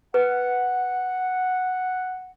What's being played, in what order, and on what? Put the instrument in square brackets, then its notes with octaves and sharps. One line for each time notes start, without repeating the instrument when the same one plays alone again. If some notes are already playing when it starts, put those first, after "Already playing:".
[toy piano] B4 [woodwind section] F#5